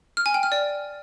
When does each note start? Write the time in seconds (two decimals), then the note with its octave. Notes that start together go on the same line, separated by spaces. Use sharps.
0.17 F6
0.26 G#5
0.34 G5
0.43 F6
0.52 D5